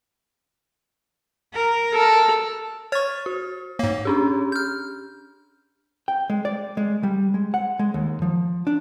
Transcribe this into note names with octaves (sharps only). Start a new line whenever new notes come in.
A#4
A4
C#5 C#6 F6 A6
F#4
G#2 A#3 C#5
C#4 D4 G4
F6 G6
G5
G#3
D5
G#3
G3
G#3
F#5
G#3
D#2
F3
D4